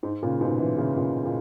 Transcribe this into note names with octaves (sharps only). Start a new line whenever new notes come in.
G#2
A#2 C#3
G#2 B2
C#3 E3
C#3 E3
A#2 C#3
A#2